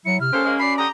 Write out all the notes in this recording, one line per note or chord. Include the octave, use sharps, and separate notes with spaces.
F#3 E4 C#7
C3 F6
A#3 C#4 G4 A4 C5
G#3 A#3
F#2 D5 B5 C7
D3 G4 A#5 D#6